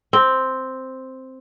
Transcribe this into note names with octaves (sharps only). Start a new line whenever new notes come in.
C4